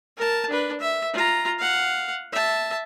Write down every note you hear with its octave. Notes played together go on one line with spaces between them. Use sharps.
A#4 A5
D4 B4
E5
F4 A#5
F5 F#5
E5 A5